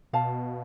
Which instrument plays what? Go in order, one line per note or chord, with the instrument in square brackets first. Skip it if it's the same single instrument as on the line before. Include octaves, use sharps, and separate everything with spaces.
[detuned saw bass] B2 [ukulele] F5 A5